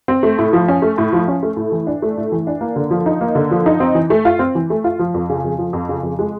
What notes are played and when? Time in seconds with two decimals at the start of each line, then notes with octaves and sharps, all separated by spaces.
0.08 C4
0.23 A3
0.38 A2
0.53 F3
0.68 C#4
0.82 A3
0.98 A2
1.13 F3
1.28 C#4
1.43 A3
1.57 A2
1.72 E3
1.87 D4
2.02 A3
2.17 A2
2.32 E3
2.47 D4
2.61 A#3
2.76 D3
2.91 F3
3.06 D#4
3.21 A#3
3.35 D3
3.51 F3
3.66 D#4
3.80 C4
3.95 E3
4.10 A3
4.25 F4
4.39 C4
4.55 E3
4.70 A3
4.84 F4
4.99 F3
5.14 F2
5.30 C#3
5.44 F2
5.58 F3
5.73 F2
5.89 C#3
6.03 F2
6.19 G#3